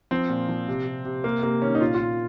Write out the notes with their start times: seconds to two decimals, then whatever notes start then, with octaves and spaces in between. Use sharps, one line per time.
0.11 F3 C4
0.29 A#2
0.49 F3
0.68 C3
0.86 C3
1.05 C3
1.24 C3 A#3
1.43 C3 A#3
1.62 D#3 C#4
1.75 D#4
1.81 A#2 F4
1.95 F4
2.00 A#2